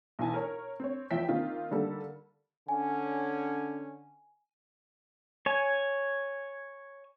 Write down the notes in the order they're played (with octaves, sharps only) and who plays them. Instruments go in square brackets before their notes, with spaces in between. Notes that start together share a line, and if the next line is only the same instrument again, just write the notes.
[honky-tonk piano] B1 E3 G#5 A5
A#4 C#5
C4 C#5
E2 F3 C#5 E5 G5 B6
D#3 A#3 C4 D#4 F4
D3 D#3 G3 A#3 A4
[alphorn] D3 [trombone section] C#4 [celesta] G#5
[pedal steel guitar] C#5 G#5